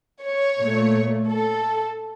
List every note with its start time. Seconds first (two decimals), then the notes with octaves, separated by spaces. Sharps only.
0.23 C#5
0.60 A#2 A3
1.32 A4